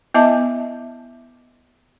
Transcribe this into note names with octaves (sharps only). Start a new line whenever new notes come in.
B3 E4 D#5 E5 A5 D6